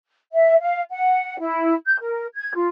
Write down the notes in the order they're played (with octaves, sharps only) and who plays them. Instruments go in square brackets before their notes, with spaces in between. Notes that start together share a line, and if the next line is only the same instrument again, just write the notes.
[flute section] E5
F5
F#5
E4
G6
A#4
G#6
F4